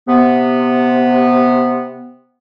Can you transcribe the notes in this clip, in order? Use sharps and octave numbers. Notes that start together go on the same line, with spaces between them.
C3 B3